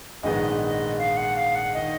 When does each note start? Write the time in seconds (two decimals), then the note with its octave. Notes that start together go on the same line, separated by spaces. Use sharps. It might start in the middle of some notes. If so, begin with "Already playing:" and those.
0.23 A#1 G#2 D#3 G#3 B3 D#5
0.98 F5
1.17 F#5
1.36 F5
1.55 F#5
1.74 D#3 D#5